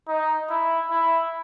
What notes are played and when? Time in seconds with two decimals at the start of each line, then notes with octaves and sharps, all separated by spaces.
0.08 D#4
0.50 E4
0.91 E4